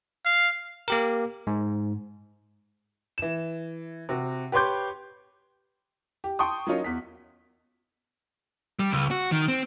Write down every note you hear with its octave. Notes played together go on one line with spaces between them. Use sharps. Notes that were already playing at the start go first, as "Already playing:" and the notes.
F5
A#3 G4 A#4
G#2
E3 E7
C3 F#4
G4 B4 C#5 C6 D6 G6
G4
G5 A5 C6 C#6 D#6
F#3 A#3 C#4 D#4 F4 C#5
E2 B6
G3
C#2
F#4
D#3
C4